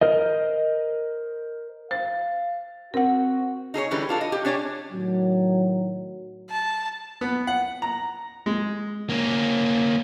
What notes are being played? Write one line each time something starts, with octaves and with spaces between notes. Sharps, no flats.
A#4 C5 D#5
C5 F5 A6
C4 F#4 A#4 F#5
D#4 G#4 A4 C#5
D3 E3 G3 C#4 B4
D4 F4 A4
D#5
G4
C#4 D4 C#5 D5 G#5
A2 D#3 F#3
A5
B3
F#5
A#5
G#3
A#3 C#4